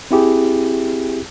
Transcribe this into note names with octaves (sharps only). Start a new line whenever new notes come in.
C4 E4 G4 G#4